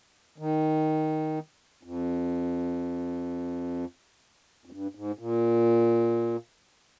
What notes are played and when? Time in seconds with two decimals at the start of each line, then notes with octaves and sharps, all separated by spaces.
0.38 D#3
1.83 F2
4.65 F2
4.71 G2
4.95 G#2
5.19 A#2